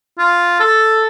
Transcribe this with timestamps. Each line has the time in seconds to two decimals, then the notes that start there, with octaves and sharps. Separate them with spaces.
0.18 F4
0.60 A4